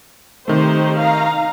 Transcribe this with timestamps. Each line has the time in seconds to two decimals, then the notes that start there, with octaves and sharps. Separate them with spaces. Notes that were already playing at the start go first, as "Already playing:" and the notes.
0.48 C3 D#3 A3 D#4 G4 C5
1.00 D#4 F5 A#5